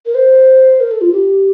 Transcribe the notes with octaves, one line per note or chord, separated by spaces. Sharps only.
A#4
C5
A#4
A4
F4
G4